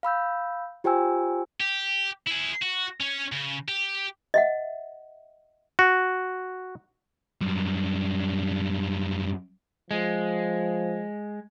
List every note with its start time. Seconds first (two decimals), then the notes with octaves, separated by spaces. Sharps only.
0.03 F5 B5 E6 G6
0.84 F4 G4 C5 G5 G#5 E6
1.61 G4
2.27 E4 G#4
2.62 F#4
3.01 C#4 C#5
3.32 C#3
3.68 G4
4.34 D#5 E5 F#5
5.79 F#4
7.41 F#2 G3
9.91 F3 G#3